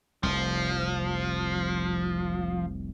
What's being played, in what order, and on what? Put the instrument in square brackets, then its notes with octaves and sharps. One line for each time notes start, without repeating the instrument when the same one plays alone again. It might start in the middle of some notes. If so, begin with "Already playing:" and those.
[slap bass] F1 C2 [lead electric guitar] F3